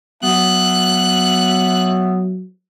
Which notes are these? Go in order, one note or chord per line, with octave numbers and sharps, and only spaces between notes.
F#3 B3 E5 F#6